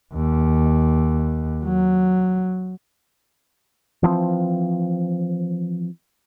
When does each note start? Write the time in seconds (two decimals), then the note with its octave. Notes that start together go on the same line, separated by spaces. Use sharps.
0.13 D#2
1.64 F#3
4.03 E3 F3 B3 C4